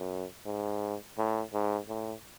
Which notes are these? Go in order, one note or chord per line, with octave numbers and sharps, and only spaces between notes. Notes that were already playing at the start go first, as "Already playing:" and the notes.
Already playing: F#2
G#2
A2
G#2
A2